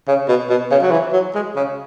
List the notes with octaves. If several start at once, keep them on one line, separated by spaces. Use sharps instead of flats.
C#3
B2
B2
C#3
F#3
E3
F#3
G#3
C#3